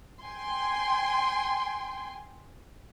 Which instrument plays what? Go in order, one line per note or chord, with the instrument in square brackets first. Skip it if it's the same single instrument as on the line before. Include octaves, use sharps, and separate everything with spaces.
[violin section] G5 G#5 C6